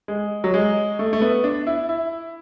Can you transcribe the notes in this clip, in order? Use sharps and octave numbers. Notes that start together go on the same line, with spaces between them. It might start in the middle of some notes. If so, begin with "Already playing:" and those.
G#3
F#3
G#3
A3
A3
B3
D4
E4
E4